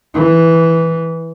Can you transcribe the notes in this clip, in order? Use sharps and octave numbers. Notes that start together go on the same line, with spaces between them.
E3